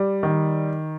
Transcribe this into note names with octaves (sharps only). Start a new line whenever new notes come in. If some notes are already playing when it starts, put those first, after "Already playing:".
Already playing: G3
D#3